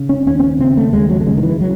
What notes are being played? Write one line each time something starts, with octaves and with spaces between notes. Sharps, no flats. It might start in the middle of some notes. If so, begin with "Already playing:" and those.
Already playing: C#3
C#4
D#2 C#4
C4
C#4
C#3 C4
A3
D#2 G#3
F#3
A3
C#3 G#3
D#3
E3
F#3